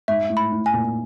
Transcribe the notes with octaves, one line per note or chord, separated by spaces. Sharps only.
G#2 E5
A2
B5
A2
G#5
A#2